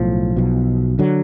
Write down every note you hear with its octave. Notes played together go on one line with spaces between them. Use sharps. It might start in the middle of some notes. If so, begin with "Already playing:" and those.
Already playing: B1 A2 F3
B1 B2
D3 F#3